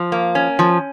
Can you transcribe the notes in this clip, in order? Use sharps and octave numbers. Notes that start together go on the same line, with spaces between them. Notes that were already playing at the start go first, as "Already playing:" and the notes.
Already playing: F3
A#3
C#4
F3